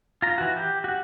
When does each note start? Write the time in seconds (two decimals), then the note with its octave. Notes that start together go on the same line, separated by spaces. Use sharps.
0.22 F4 A#5
0.38 E3 F#4
0.56 G4
0.84 F#4 F#5